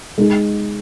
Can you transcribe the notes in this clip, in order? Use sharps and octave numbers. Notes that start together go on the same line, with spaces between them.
G#3 D#4 G#4